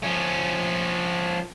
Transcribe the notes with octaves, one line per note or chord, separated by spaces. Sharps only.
F3 C#4